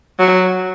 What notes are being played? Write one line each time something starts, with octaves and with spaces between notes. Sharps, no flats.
F#3